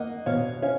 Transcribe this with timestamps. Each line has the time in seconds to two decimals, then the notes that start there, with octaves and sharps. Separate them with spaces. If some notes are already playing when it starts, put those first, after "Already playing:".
Already playing: A#3 D#5 F#5
0.26 B2 C#5 F5
0.62 C#4 C#5 F5